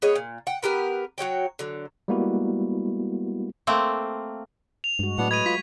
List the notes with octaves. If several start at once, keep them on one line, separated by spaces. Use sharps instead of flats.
B3 G#4 C#5 D#5
A#2
F#5 G5
B3 G4 A#4 B4
F#3 F#4 C#5 G5
D3 F#3
G3 G#3 A#3 B3 E4 F#4
A3 A#3 C4
F7
G2 G#3 F#4
A2 F#3 A3 B3 D4 F#4 F#5
B4 D#5 B5 G#6 D#7
F4 B6